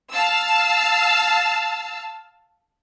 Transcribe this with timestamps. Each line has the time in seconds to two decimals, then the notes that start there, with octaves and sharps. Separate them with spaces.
0.12 F5 A5 E6